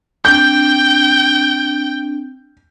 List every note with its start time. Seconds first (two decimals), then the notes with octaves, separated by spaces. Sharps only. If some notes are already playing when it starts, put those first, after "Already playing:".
0.25 C4 D4 G5 G6